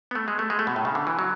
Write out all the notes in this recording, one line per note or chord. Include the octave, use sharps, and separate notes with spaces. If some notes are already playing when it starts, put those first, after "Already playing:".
B3
A3
G#3
A3
G#3
A3
B2
A2
C#3
D3
E3
F#3